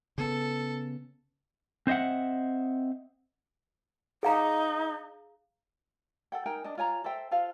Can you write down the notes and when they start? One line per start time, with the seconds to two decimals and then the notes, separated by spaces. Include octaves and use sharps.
0.18 C#3 B3 A4
1.87 C4 C5 D#5 E5 F#5
4.23 D#4 G#4 F5 A#5
6.32 A4 F#5 G5
6.46 D#4 A#4 G5 G#5
6.64 D4 D#5
6.78 F4 C#5 G#5 A#5
7.04 A4 C5 E5 G5
7.31 F4 A4 C5 F5